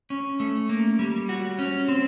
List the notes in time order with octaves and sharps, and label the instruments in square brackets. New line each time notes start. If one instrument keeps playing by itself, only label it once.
[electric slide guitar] C#4
A3
A#3
G3
F#4
C#4
C4